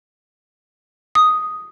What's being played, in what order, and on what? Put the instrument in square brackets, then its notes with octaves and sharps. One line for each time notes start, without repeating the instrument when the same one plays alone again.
[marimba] D#6